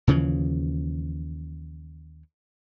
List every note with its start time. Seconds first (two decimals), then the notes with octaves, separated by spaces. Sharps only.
0.07 D#2 C#3 E3 F3